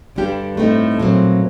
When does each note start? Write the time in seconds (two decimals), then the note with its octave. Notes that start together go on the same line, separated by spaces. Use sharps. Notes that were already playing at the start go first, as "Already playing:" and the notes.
0.16 G2 D3 G3 D4 G4
0.57 A2 A3 C4 D#4
1.00 A#2 F#3 C4